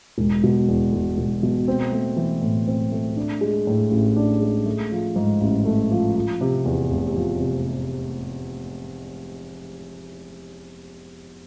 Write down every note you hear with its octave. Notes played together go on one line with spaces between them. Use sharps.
E1
B2
E2
E1
E1
B2
C4
A3
E3
A2
C4
A3
D4
G#3
A2
A1
D4
G#3
A3
F3
G#2
A1
A3
F3
F3
C3
E2
F1
F3
C3